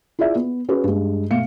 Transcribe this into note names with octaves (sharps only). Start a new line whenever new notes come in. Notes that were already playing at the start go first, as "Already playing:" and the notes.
E4 F4 G#4 D5 E5
B3
C#4 F#4 G#4 B4
G2 G#3
B2 A3 F5 C#7